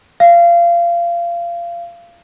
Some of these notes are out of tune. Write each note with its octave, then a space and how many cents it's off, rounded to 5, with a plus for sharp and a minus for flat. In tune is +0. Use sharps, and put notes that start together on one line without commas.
F5 -25